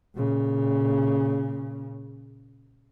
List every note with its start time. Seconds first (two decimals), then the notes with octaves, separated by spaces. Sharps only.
0.16 A#2 C#3